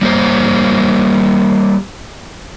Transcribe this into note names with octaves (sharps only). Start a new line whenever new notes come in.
G3 A#3 G4 C5